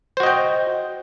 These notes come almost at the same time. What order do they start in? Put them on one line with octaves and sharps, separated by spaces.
C5 F#4 D#5 G5